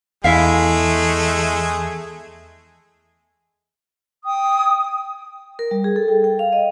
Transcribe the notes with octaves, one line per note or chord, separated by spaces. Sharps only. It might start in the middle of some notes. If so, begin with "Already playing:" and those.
E2 G#3 A3 E4 G#4 E5 F5
G5 D#6
A#4
G3
G#4
A4
G5
G5
F5
D#5